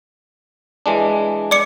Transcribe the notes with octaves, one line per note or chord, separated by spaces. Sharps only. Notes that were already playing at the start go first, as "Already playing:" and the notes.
E3 G#3 D4
D5 D6 C#7